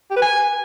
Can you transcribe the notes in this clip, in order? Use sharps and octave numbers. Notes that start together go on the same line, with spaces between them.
G4
B4
G#5